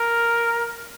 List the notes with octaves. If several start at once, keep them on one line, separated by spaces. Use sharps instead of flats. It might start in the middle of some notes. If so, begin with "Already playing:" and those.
Already playing: A#4